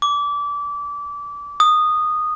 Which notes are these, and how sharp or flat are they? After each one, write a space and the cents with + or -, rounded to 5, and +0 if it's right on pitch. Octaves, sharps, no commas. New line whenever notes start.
D6 -25
D#6 -15